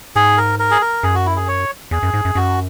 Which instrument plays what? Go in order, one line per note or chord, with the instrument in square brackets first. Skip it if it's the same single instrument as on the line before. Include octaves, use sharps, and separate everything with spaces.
[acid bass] G#2 [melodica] G#4
[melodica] A#4
A#4
G#4
A#4
[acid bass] F#2 [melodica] G#4
[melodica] F#4
E4
G#4
C#5
[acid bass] E2 [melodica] G#4
[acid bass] F#2
G#2
F#2
[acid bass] F#2 [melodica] F#4